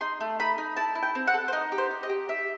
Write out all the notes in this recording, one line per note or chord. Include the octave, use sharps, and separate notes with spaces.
D#4 C6
A3
D#4 B5
D#4
E4 A5
E4
G5
C4
F#5
A4
C5
D#4 D#5
G4
C5
D#4
D#5
G4
G4 E5